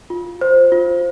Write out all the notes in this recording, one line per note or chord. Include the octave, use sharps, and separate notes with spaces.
F4
C5
F4